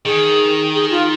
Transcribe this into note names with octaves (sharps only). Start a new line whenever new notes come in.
D#3 G#4
G#4
F4